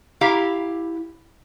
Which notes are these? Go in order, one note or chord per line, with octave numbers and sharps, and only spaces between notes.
E4 G4 F5 A#5